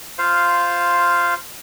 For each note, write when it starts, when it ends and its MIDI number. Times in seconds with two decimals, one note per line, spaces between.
0.18 1.34 65
0.18 1.34 72
0.18 1.34 77